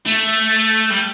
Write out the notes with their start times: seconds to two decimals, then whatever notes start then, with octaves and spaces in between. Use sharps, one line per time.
0.07 A3
0.91 G3